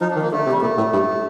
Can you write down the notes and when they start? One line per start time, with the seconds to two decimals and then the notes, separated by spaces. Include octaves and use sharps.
0.01 F3 D#4
0.11 D4
0.16 D#3
0.22 A#3
0.32 D3 A3
0.46 C3
0.52 G3
0.62 A#2 A3
0.78 A2
0.93 G2